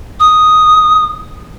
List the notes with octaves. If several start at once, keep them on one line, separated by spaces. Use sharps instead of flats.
D#6